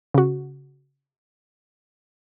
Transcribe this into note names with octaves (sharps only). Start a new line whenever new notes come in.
C#3 F#4